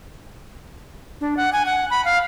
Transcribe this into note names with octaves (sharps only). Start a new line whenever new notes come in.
D4
F#5
G#5
F#5
B5
F5